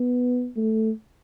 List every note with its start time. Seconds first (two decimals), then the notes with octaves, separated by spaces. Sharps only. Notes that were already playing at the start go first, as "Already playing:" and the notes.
Already playing: B3
0.57 A3